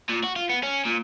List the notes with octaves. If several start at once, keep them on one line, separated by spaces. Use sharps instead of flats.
A#2
F#4
F4
B3
C#4
A#2